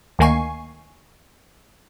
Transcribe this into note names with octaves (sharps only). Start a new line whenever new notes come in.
D2 D#3 A#3 G#5 C#6 C7